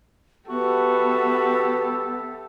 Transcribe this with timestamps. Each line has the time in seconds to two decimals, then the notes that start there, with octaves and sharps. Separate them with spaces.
0.49 B3 F#4 G4 A4 E5